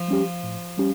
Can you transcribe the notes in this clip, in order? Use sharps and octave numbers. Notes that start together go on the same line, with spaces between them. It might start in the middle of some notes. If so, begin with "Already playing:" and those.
Already playing: F3
G3 C#4 G4
A2
G3 C#4 G4